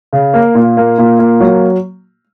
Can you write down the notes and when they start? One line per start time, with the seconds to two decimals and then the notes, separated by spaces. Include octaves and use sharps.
0.13 C#3
0.34 A#3
0.55 A#2
0.77 A#3
0.98 A#2
1.19 A#3
1.40 F#3